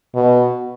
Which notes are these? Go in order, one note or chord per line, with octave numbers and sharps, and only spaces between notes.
B2